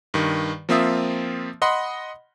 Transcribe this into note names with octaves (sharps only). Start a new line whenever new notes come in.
G2 D#3
F3 A#3 C4 F4 E5 D#6
D#5 F#5 B5 C6